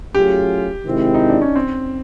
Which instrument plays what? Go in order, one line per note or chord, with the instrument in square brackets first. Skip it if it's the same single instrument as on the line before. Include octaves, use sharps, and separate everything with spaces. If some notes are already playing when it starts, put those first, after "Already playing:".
[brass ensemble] F#3 A3 C#4 F4 G#4 [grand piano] G4
[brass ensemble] C3 D#3 G#3 C4 E4
[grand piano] D#4
D4
C#4
C4